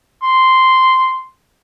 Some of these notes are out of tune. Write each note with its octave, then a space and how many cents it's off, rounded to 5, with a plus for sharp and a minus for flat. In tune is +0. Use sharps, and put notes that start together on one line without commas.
C6 -5